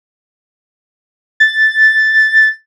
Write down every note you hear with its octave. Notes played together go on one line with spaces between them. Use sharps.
A6